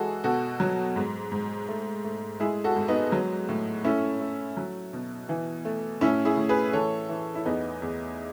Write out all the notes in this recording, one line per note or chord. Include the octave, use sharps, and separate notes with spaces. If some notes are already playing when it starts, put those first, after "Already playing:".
Already playing: E3 G#3 F#4 G#4 A4
B2 F#4 A4
F#3
G#2
G#2
A3
A3
G#3 E4 G#4
F#4 A4
G#2
B3 D#4
F#3
A2
A3 C#4 E4
A3
F#3
B2
E3
A3
A2 C#4 E4
E4 G#4
A2
G#4 B4
E3 A4 C#5
E3
E4
E2 B3 D#4
E2